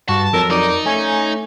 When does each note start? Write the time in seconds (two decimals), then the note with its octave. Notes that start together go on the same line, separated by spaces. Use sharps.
0.09 G2 F#4 A5
0.33 F2 F#3 A#4 E6 A#6
0.51 D#4 A#4 D5
0.86 A3 C#4 G#5